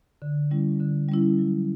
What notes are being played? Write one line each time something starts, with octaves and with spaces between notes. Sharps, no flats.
D3
G3 C#4 E4
D3
G3 C#4 E4
F#3